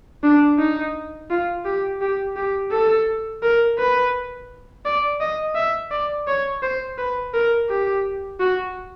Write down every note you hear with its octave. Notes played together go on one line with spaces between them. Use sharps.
D4
D#4
F4
G4
G4
G4
A4
A#4
B4
D5
D#5
E5
D5
C#5
C5
B4
A#4
G4
F#4